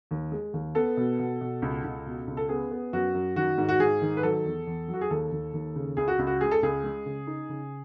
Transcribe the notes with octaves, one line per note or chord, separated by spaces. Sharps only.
D#2
G#3
D#2
B3 A4
B2
B2
B2
C#2
C#2
B2
C#2
A4
B3 G#4
B3
F#2 F#4
F#2
D#3 F#4
G#2
F#4
G#2 G#4
D#3
B4
F#3 A4
E2
E2
F#3
F#4
G#4
D#2 A4
D#2
D#2
C#3
C#2 G#4
F#4
C#2
F#4
G#3 G#4
A4
C#2 G#4
G#3
C#3
D#4
C#3